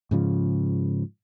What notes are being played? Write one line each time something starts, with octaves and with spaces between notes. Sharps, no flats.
G#2 C#3 F3